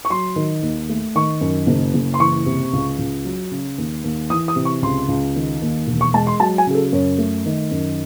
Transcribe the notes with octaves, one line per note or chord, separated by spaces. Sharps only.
C#6
F#3 C6
D#3
D#2
A3
D#3 C#6
F#2
F#1
F#1
C6
E3 C#6
C3
C#2
C#2
F#3
C#3
D#2
D#2
E3 D#6
D#6
C3
C#6
C#2 C6
C#2
D#3
D#2
E1
C#6
G#3 A5
C6
F#3 A5
G#5
C#3 G#4
A4
F#2 C#5
A3
D#3
F#2